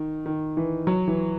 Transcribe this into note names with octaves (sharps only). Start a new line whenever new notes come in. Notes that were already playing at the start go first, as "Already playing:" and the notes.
Already playing: D#3
D#3
E3
F#3
E3